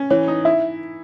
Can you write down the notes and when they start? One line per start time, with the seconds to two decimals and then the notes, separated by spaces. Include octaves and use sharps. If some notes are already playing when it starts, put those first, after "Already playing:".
Already playing: C#4
0.10 E3 C#5
0.28 D#4
0.45 E4 E5